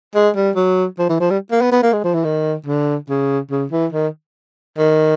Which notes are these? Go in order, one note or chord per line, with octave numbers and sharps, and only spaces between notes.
G#3
G3
F#3
F3
E3
F3
G3
A#3
B3
B3
A#3
G#3
F3
E3
D#3
D3
C#3
C#3
E3
D#3
D#3